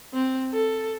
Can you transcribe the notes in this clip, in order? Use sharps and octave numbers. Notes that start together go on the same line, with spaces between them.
C4
A4